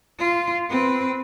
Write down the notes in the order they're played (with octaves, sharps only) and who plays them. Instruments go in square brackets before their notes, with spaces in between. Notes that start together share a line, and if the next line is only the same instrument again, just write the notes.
[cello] F4
C4 B4